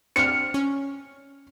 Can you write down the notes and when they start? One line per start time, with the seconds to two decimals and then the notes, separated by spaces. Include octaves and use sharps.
0.16 C4 D4 F6 C#7
0.54 C#4